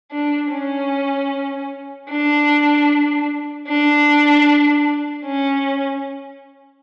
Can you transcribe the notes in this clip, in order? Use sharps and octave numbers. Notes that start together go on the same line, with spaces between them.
D4
C#4
D4
D4
C#4